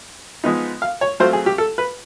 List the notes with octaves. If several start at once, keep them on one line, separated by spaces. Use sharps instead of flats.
F3 G#3 B3 D#4
F5
C#5
F#3 A3 C4 F4 C5
G#4
G4
A4
B4